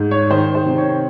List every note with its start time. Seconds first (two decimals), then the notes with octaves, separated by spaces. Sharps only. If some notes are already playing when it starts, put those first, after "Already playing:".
Already playing: G#2
0.11 C#5
0.30 D#3 C5
0.55 C5
0.66 C3
0.78 C#5